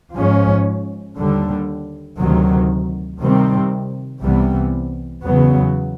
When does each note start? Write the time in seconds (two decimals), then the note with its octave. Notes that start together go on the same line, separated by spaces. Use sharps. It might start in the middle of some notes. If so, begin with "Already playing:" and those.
0.15 G#2 F3 G#3 C#4
1.16 D#2 D3 G3
2.18 D2 C3 D#3 F#3
3.21 C3 D#3 G3 C4
4.22 C2 C3 E3 G3 B3
5.25 E2 C#3 F#3 B3